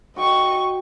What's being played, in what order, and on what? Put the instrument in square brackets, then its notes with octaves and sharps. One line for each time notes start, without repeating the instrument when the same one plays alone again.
[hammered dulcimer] F#4 G5 [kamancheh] D#5 C#6